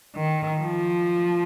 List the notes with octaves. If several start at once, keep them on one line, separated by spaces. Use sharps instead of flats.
D#3
F3